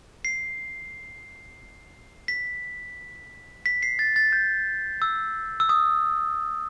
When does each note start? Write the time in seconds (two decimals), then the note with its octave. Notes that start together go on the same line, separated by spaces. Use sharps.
0.25 C7
2.28 B6
3.66 B6
3.83 C7
3.99 A6
4.16 A6
4.32 G6
5.02 E6
5.60 E6
5.69 D#6